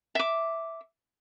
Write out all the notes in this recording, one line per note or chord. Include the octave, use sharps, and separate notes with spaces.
E5 D6